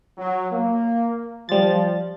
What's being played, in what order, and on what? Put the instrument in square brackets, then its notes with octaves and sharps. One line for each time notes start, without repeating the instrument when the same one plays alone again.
[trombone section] F#3
A#3
[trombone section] F3 [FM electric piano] G3 A6